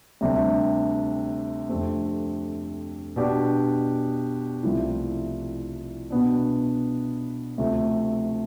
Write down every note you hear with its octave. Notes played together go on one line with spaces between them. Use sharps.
D2 C3 G3 D4
F2 D3 A3 C4 G4
B2 B3 D4 G4 D5
C2 C3 F3 A3 E4
B2 B3 D4
D2 C3 F3 A3